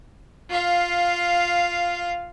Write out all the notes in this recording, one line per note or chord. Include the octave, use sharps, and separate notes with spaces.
F4 F5